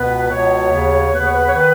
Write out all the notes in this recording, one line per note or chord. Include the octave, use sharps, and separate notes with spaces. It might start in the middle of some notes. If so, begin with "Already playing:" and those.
Already playing: C#2 B2 B3 B4
C#2 B2 B3 C#5
D#2 C#3 B3
D#2 C#3 B3 B4
C#5
B4
C#5
D#3 B3 B4